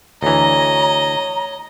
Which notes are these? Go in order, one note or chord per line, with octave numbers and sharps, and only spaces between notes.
D2 E3 C#5 D#5 A#5